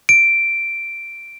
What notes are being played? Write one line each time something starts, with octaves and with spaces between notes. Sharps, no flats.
D7